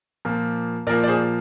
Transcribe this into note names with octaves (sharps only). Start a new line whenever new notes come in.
A#2 F3 A#3
A#2 F3 A#3 A#4 D5
D5
G#4 C5